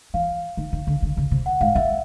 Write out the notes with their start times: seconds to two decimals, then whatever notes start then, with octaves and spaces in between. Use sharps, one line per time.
0.14 E3 F5
0.57 D#3
0.72 D#3
0.87 D3
1.02 D3
1.17 C#3
1.31 C3
1.46 F#5
1.61 G#2 F5
1.75 F#2 E5